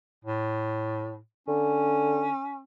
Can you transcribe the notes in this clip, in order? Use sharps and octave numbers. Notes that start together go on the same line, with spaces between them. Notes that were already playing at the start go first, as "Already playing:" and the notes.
A2
D3 C#4